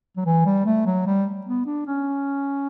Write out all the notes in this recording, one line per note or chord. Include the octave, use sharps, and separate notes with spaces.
F#3
E3
G3
A3
F#3
G3
B3
D4
C#4